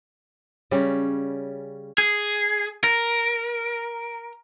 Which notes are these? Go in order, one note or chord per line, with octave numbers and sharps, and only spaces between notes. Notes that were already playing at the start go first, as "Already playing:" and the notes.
C#3 G3 C#4
G#4
A#4